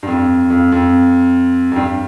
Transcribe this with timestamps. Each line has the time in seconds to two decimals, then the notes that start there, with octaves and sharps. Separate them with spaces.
0.03 G2
0.07 F2
0.50 F2
0.72 F2
1.72 F2
1.76 G2